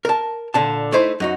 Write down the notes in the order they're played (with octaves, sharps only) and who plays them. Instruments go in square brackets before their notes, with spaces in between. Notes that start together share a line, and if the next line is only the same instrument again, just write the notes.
[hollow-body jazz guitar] A#4 A5
A#2 D3 A5
A3 D#4 E4 C5
F#2 D#4 F#4